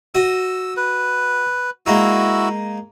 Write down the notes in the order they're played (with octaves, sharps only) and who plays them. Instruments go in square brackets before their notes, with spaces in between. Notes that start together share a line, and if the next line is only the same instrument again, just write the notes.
[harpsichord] F#4 D#5 [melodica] E6
[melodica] B4
[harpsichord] G#3 A#3 D#4 [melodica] E4 F#4 E6